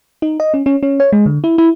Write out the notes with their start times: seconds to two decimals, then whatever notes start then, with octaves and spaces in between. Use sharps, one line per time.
0.22 D#4
0.40 D#5
0.54 C#4
0.66 C#4
0.83 C#4
1.00 C#5
1.12 G#3
1.26 D3
1.44 E4
1.58 E4